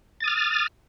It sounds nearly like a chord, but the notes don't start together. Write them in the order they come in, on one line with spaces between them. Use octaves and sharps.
A6 D#6 F6